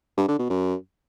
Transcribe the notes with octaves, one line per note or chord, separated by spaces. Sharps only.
G2
D3
B2
F#2